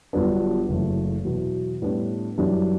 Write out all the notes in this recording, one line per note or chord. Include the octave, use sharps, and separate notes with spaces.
G1 G2 F#3 B3 D4
F#1 F#2 E3 A3
E2 B2 F#3 B3 E4
A2 G3 B3 D4
F#2 E3 G3 D4